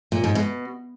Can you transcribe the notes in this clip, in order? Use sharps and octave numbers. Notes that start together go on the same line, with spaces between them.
A#2
G#2
B2